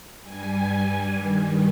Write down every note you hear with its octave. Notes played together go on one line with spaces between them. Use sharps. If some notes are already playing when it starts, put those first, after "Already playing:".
G2 G3 G#5
G2 D#3 G3